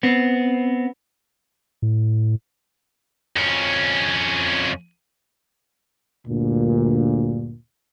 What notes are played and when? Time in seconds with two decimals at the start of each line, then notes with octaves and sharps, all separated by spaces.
0.03 B3 C4
1.82 A2
3.36 F2 C#4
6.27 D2 G2 A#2